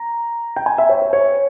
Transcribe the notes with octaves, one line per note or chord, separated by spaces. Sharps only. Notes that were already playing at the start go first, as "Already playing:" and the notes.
Already playing: A#5
G5
G#5
E5
C#5
C#5
C#5